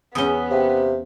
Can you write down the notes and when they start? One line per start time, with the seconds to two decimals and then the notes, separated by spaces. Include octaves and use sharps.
0.15 E2 B3 C#4 D#6 G7
0.51 C3 F5 G5